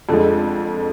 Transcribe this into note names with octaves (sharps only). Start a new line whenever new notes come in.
F2 D3 F3 G#3 A4